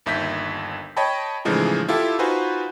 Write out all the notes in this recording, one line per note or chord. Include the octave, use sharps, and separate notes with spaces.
G1 D#2 E5 G6 B6
C#5 D#5 G5 A5 B5
A2 C#3 E3 F3 G#3 D#4
E4 F4 G4 A4
D#4 F4 F#4 B4 C5 G#5